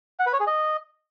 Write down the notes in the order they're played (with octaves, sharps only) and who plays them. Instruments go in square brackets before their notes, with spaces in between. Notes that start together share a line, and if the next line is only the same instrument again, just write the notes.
[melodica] F#5
B4
C#5
G#4
D#5